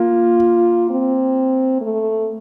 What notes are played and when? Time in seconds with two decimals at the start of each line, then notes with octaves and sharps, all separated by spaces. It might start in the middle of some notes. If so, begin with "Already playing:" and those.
Already playing: A#3 F4
0.90 C4
1.81 A3